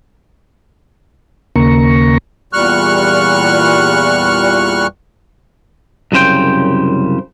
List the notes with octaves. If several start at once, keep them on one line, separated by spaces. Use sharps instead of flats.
D#2 C#3 A#3 A#5 C#6
E2 A#2 G3 C#6 F6 F#6
C2 F#2 C#3 C5 G5